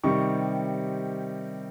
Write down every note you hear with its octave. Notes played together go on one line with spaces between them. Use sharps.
C3 D#3 G3 C4 C#6